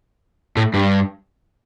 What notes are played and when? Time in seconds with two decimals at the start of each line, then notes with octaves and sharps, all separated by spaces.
0.57 A2
0.74 G2